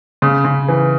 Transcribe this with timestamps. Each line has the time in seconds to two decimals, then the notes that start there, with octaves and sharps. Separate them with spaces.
0.22 C#3
0.45 C#3
0.68 E3